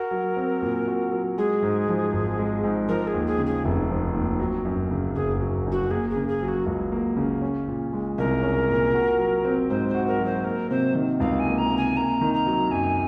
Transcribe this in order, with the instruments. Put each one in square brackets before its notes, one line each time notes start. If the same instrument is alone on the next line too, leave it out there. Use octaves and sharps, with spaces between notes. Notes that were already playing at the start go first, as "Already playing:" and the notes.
Already playing: [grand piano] F#4 [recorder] A#4
[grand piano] F#3
C4
A#2
F#4
F#3
[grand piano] G#3 [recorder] G#4
[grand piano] G#2
F3
G#1
G#3
G#2
[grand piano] F3 [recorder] A#4
[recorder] G#4
[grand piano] D#2
[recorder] G#4
[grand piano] C#3
[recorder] G#4
[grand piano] F1
F3
D#2
F#3
F#2
C#3
[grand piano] F#1 [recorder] G#4
[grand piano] F#3
F#2
[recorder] F#4
[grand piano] A#3 [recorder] G#4
[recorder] G#4
[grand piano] C#3
[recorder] G#4
[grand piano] F#3
[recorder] F#4
[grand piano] C#2
A#3
C#3
C#4
A#2
G#3
[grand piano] C2 [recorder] A#4
[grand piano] C#4
A#2
F#4
F#3
C4
[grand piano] G#2 [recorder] C5
[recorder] C5
[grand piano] F#4
[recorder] A#4
[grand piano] F#3
[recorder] C5
[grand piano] A#3 [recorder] A#4
[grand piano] C3 [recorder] C5
[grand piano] D#3
[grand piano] C#2 [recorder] F5
[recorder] G#5
[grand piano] A#3
[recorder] A#5
[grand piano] C3
[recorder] G#5
[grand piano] A#3 [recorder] A#5
[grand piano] D#3
[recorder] A#5
[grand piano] F#3
[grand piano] F#2 [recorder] G#5